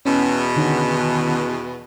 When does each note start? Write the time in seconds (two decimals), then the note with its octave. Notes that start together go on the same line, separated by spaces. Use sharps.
0.06 E2 B2 C#4 B5
0.56 D3 D#3 C#4